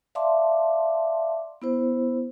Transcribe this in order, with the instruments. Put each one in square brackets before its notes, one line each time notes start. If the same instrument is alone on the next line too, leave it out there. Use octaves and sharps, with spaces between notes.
[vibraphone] D5 E5 F5 A5 C6 D6
B3 E4 C5